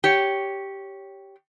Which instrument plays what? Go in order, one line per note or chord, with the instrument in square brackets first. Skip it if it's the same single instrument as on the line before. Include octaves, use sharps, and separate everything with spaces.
[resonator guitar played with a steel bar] G4 C#5